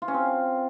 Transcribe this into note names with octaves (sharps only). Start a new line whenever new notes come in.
F4
C#4
C4